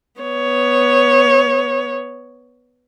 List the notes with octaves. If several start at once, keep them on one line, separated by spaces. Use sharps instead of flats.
B3 C#5